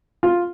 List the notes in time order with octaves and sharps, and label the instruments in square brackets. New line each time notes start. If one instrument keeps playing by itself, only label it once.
[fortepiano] F4